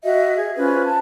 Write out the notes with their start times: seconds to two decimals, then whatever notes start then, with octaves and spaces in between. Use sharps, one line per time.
0.04 F#4 D#5 E5
0.37 G#4
0.57 C#4 F4 B4 C5
0.84 A5